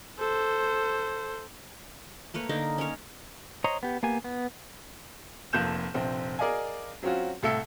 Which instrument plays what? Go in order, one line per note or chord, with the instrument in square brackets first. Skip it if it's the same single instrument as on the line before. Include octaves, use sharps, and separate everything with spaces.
[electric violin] A4 C5
[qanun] A3 A#3 B4 C#5
D3 A#3 D#4 D6
C#4 A#4 C#5
[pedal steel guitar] C5 C#5 D#5 A#5
B3 G4
A#3 B3 G4 G#5
B3
[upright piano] F1 F2 A#3 F#6 G6 E7
F1 A#1 C4
G#4 A#4 D5 D#5 F5 G#5
F#3 C4 C#4 F4 F#4
C2 A2 A4 E5 F5 C#7